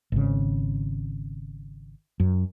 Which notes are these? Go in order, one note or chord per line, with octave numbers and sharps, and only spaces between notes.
G#1 C#3
F#2